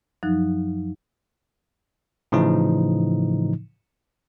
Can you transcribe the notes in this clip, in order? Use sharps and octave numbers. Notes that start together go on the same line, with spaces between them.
F#2 F3 F#3 D#4 F#6
A2 C#3 E3 F3 D#4